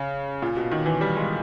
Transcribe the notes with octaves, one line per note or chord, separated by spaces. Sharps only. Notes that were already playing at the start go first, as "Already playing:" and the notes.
Already playing: C#3
A#2
B2
D#3
E3
G3
G#3